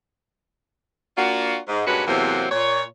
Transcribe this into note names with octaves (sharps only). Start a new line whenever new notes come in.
A#3 D4 F4 F#4
G#2
G2 A#2 G#3 C#4 F#4 B4
E2 C3 E3 F#3 A#3 C4
A#2 C#5